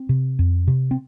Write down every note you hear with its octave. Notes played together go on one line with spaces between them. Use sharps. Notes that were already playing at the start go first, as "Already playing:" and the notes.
Already playing: C4
C3
F2
C3
C4